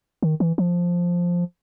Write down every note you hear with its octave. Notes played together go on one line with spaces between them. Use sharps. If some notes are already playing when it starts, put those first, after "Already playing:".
D#3
E3
F3